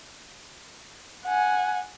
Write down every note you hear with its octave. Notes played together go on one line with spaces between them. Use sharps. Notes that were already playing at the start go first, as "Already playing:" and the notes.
F#5 G#5